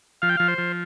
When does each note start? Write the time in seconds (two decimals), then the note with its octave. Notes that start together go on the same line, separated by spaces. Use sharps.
0.22 F3 F5
0.29 G5
0.37 F3 F5
0.48 C5
0.58 F3